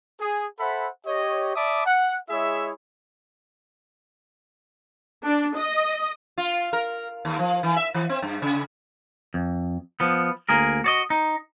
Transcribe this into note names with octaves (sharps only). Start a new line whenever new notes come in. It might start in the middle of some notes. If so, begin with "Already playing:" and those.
G#4
A4 C5 E5 F#5 B5
G4 C#5 D#5
D5 E5 A5 B5 D6 D#6
F#5
G#3 E4 G#4 C#5 E5
D4
D#5
F4
A#4
D#2
F3
E3
E5
E3
C4
G2
C#3
F2
F3 B3
D2 A#3 G#4 A#4
F#4 D5 D#5
D#4